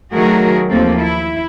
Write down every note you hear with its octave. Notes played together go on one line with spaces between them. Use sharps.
D#3 F#3 A3 F#4 G#4 A#4
D#2 F3 A#3 C4 A4
E4